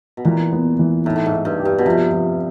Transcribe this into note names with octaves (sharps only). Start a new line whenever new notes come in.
B2
A#2 E3
B3
E3
A2 D#4
A2
G#2
D#4
G2
G4
G2
B2
C3 F3
F3